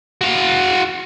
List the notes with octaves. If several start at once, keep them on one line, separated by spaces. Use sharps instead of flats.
F#4 F5